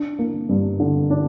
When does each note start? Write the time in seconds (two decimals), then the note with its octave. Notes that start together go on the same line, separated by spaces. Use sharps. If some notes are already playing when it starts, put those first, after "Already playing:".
Already playing: D4
0.19 A#3
0.49 G2
0.80 D3
1.10 D4